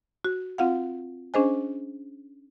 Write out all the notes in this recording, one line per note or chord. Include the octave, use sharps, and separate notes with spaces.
F#4
C4 F4 F5 F#5
C#4 D4 G#4 C5 D#5 G#5